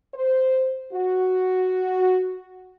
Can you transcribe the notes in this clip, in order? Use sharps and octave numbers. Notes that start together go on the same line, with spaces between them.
C5
F#4